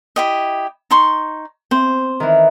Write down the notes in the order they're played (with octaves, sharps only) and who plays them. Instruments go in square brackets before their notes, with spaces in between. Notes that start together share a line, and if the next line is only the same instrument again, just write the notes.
[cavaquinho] E4 G4 D#5
D#4 C6 C#6
[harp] C4 [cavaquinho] C5
[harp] D#3 E3